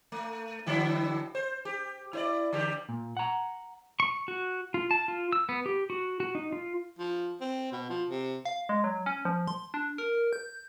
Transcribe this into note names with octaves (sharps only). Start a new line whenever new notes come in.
A3
D3 F#3 E4
C5
G4
E4 C5 D5
D3 G3 G4
A#2
F#5 A#5
C#6
F#4
F4
A5
F4
E6
B3
G4
F#4
F#4
D#4
F4
F3
C4
B2
F3
C3
F5
G#3
F#3
C#4
F3
C6
D4
A#4
G6